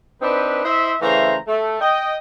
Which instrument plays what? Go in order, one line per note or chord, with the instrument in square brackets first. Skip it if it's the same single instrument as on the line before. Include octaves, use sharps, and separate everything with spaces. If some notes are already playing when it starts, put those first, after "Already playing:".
[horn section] C4 D4 D#4 B4
E4 C5 D#5 E5
C#3 E3 A3 C5 F5 A#5
A3
D#5 G5